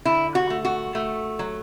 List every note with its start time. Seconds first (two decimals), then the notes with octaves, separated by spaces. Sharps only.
0.05 D3 E4
0.35 F#4
0.50 A3
0.65 F#4
0.95 A3
1.39 F#3